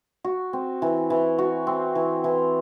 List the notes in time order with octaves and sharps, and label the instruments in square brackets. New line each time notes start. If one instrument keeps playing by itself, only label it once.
[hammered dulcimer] F#4
C4
E3
E3
F#4
C4
E3
E3